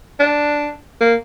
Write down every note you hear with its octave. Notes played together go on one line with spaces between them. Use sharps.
D4
A#3